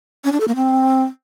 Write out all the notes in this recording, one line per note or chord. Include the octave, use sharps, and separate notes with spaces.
C#4
D4
A4
A#3
C4